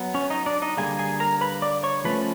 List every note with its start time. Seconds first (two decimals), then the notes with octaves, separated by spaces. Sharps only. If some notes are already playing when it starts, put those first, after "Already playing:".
Already playing: F#3 B3
0.14 C#4 C#5
0.30 D#4 D#5
0.46 D4 D5
0.62 D#4 D#5
0.77 D3 G3 A#3 G#4 G#5
0.99 G#4 G#5
1.20 A#4 A#5
1.41 B4 B5
1.62 D5 D6
1.83 C#5 C#6
2.05 F3 A3 C#4 B4 B5